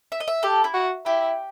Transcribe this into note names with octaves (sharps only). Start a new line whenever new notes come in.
E5
D#5
E5
G4 A4
E4
F#4
E4 G4